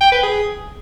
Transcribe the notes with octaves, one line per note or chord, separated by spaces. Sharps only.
G5
B4
G#4